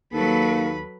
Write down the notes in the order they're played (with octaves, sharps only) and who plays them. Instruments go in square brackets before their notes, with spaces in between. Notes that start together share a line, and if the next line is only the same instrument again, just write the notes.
[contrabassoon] D#2 [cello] F#3 A4 [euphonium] A#3 [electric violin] B4 B5